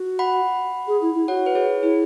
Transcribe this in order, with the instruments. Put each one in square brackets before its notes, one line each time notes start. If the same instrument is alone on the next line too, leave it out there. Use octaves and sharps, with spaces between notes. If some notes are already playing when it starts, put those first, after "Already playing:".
Already playing: [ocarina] F#4
[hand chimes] F#5 B5
[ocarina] G#4
E4
E4
[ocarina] F#4 [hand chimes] C#5 F#5
[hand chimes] B4
G#4 C#5
[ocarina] E4 [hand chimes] G#4